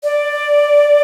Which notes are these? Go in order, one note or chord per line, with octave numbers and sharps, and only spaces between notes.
D5